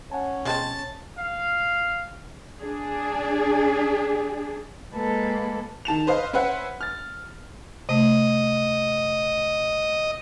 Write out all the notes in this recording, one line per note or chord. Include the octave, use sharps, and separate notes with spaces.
C#4 C#5 F#5 G#5 A5
B2 F3 G#3 B3 C4 A5
F5
D4 G#4
G#3 A#3 A4 B4
D#3 A5 E7 F7
B4 C5 D#5 F5
C#4 B4 C5 E5 F#5
F6 A6
C3 A3 D#5